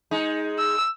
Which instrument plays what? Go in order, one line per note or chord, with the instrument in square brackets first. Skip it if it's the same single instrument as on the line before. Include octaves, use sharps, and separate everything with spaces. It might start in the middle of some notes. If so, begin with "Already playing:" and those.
[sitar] G#3 D#4
[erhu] E6